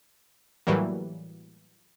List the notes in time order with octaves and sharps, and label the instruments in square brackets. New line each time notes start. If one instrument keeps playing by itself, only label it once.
[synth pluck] A2 E3 F#3 G3 A#3